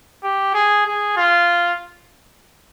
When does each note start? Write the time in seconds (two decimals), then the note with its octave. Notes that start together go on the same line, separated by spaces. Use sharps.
0.24 G4
0.54 G#4
0.86 G#4
1.17 F4